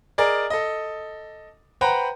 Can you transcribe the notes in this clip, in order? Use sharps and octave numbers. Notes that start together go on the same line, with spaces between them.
G#4 A#4 D5 D#5
A4 D#5
B4 C5 F#5 G5 A#5 B5